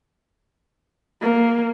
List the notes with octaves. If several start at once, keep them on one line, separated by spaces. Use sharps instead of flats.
A#3